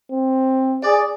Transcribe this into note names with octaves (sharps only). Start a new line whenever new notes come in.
C4
G#4 D5